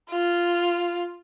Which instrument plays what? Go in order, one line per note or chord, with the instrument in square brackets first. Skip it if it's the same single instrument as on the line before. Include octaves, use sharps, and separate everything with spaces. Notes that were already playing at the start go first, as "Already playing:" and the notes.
[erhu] F4